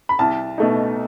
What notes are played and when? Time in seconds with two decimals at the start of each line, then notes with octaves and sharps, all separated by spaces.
0.09 B5
0.19 C2 A5
0.58 B2 A3 D#4